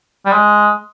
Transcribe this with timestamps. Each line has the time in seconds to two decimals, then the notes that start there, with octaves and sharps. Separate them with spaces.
0.26 G3
0.32 G#3